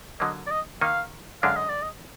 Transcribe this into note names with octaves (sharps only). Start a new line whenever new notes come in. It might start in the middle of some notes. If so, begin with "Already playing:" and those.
D3 F#3 A#3 D#5
D5
D#5
D#3 A#3 D#4 F5
F#2 D3 G#3 D4 F5
D#5
D5
D#5